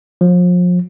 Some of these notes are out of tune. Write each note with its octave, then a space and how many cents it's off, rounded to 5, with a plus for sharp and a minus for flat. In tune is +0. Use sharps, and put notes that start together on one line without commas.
F3 +35